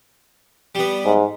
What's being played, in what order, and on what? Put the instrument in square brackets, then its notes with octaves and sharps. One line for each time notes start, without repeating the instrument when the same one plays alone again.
[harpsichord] G3 B3
[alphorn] G#2